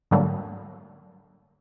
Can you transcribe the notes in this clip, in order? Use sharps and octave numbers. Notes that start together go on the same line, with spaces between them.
G#2 D3 F#3 G3 A3 A#3